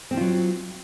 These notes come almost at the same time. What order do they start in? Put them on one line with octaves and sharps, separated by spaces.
C4 F3 F4 F#3